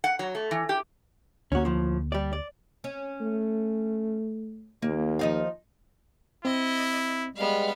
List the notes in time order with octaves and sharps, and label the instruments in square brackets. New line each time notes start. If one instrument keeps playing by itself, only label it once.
[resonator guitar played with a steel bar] F#5
F#3
A3
E3
G4
[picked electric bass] D2 A#3 [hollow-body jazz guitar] C#4 F#4
[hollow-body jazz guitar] A2 F3
G3 D5
D5
[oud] C#4
[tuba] A3
[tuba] D#2 [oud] A#3
[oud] F3 D#4 F5
[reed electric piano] C4 [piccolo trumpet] E4 [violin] D#5
[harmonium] G3 G#3 [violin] B3 F5